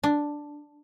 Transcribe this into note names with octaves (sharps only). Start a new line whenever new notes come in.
D4